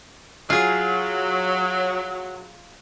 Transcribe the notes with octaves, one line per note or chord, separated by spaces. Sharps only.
F#3 F4 G#4